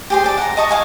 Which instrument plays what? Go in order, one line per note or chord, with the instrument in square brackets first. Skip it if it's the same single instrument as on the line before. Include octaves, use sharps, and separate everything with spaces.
[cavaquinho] G4 G#4 C5
A4 D5
F#5 A#5
D#5 A5 C#6 D#6
F5 G#5 C#6